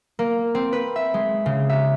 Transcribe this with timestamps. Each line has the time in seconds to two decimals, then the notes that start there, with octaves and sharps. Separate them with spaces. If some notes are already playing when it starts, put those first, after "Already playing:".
0.19 A#3
0.55 C4
0.73 B4
0.96 E5
1.14 G#3
1.46 C#3
1.69 E5